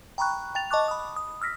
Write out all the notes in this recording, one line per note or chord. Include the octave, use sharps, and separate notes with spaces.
G5 A#5 B5 C#6 F#6
G5 A6 F7
D#5 A5 C#6 D6 F#6
B5 D#6
D#6
E6 F6 A#6 B6